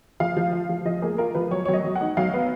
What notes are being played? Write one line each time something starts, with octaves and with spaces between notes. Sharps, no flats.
F3 F5
F3
F4
F3
F3 D#5
A#3 G#4
F4 A#4
F3 B4
F#3 C#5
C#5
F#3
D#5
F#3
F#5
D#4
F#3 F5
B3